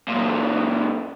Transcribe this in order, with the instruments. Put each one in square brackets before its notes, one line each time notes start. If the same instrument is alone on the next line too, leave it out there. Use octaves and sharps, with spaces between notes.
[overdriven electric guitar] F#2 A#2